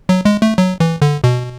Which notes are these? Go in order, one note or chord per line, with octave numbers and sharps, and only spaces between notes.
F#3
G#3
A3
F#3
E3
D3
B2